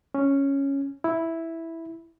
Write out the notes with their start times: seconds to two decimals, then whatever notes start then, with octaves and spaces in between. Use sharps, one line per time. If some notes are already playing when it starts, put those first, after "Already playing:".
0.15 C#4
1.04 E4